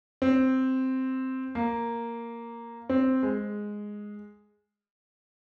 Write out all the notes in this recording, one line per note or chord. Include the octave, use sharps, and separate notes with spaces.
C4
A#3
C4
G#3